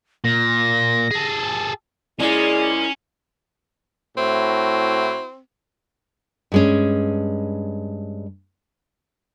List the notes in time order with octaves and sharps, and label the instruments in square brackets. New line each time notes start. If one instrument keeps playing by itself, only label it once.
[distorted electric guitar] A#2 [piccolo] A#6
[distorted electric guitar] G#4 A4
[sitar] A#2 G#3 A#3 [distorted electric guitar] C#4 [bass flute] E4 [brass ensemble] G#4 D5
[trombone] A2 [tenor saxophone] C4 [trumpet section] E4 F#4
[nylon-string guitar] G2 G#3 C#4